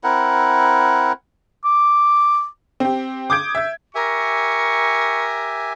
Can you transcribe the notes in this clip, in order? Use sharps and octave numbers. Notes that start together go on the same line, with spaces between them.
C4 E4 A#4 F#5
D6
C4 G4
D6 D#6 G6 G#6 D7
E5 G#6
G4 A#4 E5 G#5 C#6